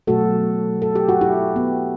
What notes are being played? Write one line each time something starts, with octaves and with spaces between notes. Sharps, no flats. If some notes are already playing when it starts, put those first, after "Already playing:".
B2 F#3 A3 F#4 A4
A4
G4
F#4
E4 G4
B3